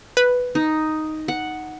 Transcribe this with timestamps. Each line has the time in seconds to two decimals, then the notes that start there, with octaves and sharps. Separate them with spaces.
0.17 B4
0.55 D#4
1.28 F#5